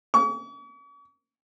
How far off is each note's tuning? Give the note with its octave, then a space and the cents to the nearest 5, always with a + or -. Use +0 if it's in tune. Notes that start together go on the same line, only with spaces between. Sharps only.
C#6 +45